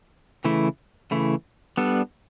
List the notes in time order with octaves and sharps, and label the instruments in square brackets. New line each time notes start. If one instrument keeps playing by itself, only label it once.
[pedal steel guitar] C#3 E3 A3 E4
C#3 E3 A3 E4
G3 B3 D4 A4